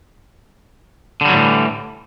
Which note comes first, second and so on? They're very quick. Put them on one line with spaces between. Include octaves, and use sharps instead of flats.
D3 G3 F#3 A2 E3